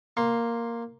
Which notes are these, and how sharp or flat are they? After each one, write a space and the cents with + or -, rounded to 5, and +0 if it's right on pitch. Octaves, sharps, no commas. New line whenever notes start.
A#3 +0 C6 +10